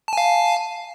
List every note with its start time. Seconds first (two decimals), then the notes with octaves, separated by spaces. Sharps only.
0.08 A5
0.13 G#5
0.17 F5